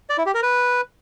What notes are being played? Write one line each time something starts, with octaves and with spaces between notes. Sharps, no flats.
D5
E4
G4
A#4
B4